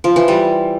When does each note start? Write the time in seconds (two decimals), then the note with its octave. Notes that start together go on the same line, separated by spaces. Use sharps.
0.04 F3
0.16 E3
0.28 G3